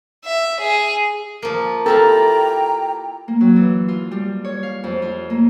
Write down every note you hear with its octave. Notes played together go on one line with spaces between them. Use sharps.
E5
G#4
F3 A#3
E4 F4 G4 A4 G5 A#5
A#3
F#3
E3
F4
G3
C#5
F5
F2
F4
A#3